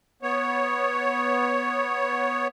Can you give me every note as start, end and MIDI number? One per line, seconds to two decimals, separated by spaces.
0.22 2.47 59
0.22 2.47 73